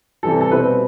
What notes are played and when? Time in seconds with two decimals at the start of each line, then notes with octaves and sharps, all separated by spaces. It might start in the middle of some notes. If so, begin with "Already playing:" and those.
0.23 C3 E3 G3 A4
0.41 A4
0.51 B2 G3 C4 E4 B4